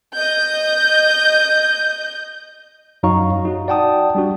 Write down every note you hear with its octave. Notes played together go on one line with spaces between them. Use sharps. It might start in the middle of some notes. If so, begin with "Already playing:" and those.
D#5 G6
F#2 F#3 D#4 F5 A#5 C#6
D#4 F#4
D5 F#5 G5 A5 D#6
G3 D4 F#4